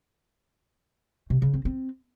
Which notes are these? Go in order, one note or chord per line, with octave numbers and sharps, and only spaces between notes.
C3
C#3
C4
C4